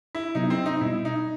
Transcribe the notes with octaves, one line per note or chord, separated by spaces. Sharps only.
E4
C3 F#3 B3 D#4 E4
C4
D#4
B2 G3 B3 E4
D#4